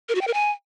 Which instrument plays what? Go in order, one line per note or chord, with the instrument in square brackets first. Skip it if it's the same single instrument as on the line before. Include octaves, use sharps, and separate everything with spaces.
[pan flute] A#4
F#4
G5
A#4
G#5